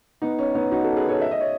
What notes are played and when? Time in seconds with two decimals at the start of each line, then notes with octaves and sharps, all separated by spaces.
0.22 B3 D#4
0.39 C#4
0.55 B3 D#4
0.72 D#4 F#4
0.84 F#4 A4
0.96 G#4 B4
1.09 A4 C#5
1.22 E5
1.31 D#5
1.41 C#5